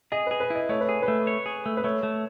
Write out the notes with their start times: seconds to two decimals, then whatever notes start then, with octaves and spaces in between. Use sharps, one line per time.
0.12 G#4 D#5
0.27 G#4 B4
0.40 B4
0.50 E4 D#5
0.69 A3 C#5
0.81 B4
0.89 G#4
1.02 B4
1.08 A3
1.27 C#5
1.46 G#4
1.66 A3
1.77 B4
1.84 A3 C#5
2.03 A3